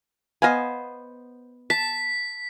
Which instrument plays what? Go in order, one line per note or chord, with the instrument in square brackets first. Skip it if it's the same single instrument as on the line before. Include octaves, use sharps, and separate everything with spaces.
[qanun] B3 C5 [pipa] D#5 F5 G#5
[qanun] A5 [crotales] B6